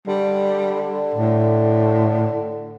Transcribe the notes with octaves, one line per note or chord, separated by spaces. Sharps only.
D3 G3
A2